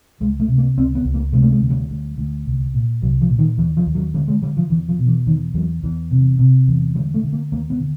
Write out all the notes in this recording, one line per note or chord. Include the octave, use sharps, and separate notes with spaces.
C#2 G#3
A3
C3
A#3
C#2 C4
B3
C#2
A#3
C3 G#3
A3
G#3
D2
G3
D2
D2
C2
A#2
C2 F#3
F3
A#2
D#3
D#2 E3
F3
D#2
F#3
D3 G3
G#3
D3 G3
F3
E2 E3
F3
B2
E3
E2 D#3
E2 F#3
E2 E3
C3
C3
E2
D3 G3
A3
D3
A#3
D#2 A#3
B3
D3